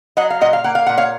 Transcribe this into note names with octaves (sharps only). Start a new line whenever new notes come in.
F#3 D#5 F#5
F5
A#2 D#5 F#5
F5
A#3 F#5
F5
A#2 F#5
C#5 F5